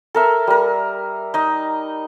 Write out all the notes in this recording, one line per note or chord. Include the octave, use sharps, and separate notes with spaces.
A4 A#4 E5
G3 A#4
D#4 D#5